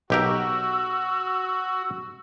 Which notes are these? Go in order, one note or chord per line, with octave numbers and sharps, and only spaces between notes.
B1 F#4 G4 A#4 E6